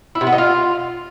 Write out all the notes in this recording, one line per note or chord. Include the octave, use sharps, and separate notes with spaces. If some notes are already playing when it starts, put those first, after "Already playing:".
E4
C3
B3
D#4
F4